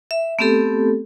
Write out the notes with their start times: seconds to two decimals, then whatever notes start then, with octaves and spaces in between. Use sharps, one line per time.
0.11 E5
0.39 A3 B3 C4 G4 A4